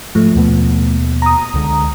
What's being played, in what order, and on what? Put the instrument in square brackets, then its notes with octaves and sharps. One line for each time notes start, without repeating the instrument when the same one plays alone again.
[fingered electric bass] G#2 [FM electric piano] F3 A3
[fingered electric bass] D#2 B2 B3
[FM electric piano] A#5 D#6
[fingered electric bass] C#2 D3 G#3